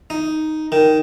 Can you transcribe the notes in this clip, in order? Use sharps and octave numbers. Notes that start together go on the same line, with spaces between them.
D#4
D#3